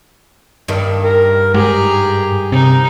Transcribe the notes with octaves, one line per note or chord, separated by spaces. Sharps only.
G2 D#3
A#4
G#2 G4 G#4 A#5
C3 D#4 A#4